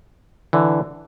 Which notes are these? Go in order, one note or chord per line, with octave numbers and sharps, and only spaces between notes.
D3 E3